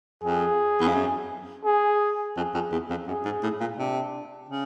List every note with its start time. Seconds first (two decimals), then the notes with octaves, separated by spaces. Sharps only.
0.23 F2 G#4
0.80 E2
0.88 F2
0.94 F#2
1.65 G#4
2.36 F2 G#4
2.54 F2
2.72 E2
2.90 F2
3.07 F#2 G#4
3.25 G#2
3.43 A2
3.60 A#2
3.78 C3 D4
4.49 C#3